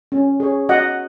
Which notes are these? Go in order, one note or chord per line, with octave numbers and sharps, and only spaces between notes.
C#4
G#4 C#5
F#4 D#5 F#5